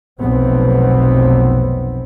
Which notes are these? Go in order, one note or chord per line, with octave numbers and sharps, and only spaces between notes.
F1 B1 B3 C4